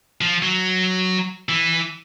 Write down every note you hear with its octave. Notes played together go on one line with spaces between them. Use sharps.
F3
F#3
E3